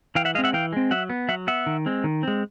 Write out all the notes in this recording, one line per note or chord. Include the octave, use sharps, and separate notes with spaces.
E3 F5 G5
E5 F#5
G#3 C4 D#5 F5
E5 F#5
E3 F5 G5
G#3 C4
F#3 E5 F#5
B3
F#3 E5 F#5
B3 E5 F#5
D#3
G#3 C4
D#3
G#3 C4